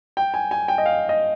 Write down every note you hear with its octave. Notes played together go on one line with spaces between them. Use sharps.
G5
G#5
G#5
G5
D#5
F5
D#5